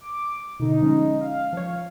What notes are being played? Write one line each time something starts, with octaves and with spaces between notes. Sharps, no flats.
D6
B2 D3 D#4
F3 G#3 C#4
F5
F3 C#5